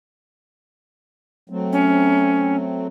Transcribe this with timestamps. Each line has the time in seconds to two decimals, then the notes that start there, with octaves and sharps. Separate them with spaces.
1.50 F#3 A3 C4
1.72 C#4